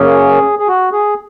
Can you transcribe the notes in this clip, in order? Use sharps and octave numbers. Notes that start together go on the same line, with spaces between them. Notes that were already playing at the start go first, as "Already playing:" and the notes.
Already playing: F#2 C#3 A#3 C#4 G#4
G#4
F#4
G#4